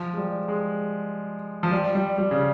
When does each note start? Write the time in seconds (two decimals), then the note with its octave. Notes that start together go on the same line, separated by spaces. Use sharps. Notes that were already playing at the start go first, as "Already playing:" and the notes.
Already playing: F3
0.13 G#3
0.17 G3
0.48 G#3
1.63 F3
1.71 G3
1.95 G3
2.18 G3
2.31 C#3